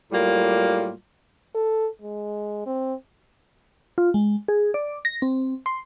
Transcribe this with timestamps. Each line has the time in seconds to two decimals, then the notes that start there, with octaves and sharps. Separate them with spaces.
0.12 A2 F#3 G3 A#3 F4
1.55 A4
2.02 G#3
2.66 C4
3.98 F4
4.14 G#3
4.48 G#4
4.74 D5
5.05 A#6
5.22 C4
5.66 C6